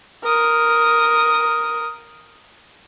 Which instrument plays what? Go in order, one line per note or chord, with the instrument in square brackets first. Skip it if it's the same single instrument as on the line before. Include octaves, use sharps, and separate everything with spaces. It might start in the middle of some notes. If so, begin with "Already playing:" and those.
[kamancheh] A#4 D#6